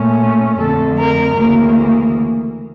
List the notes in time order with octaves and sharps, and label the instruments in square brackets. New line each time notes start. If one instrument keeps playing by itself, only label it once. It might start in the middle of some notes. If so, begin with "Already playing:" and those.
Already playing: [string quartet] A#2 A3 C#4
F2 D3 A3 A4
A#4
D2 C#3 E3 A#3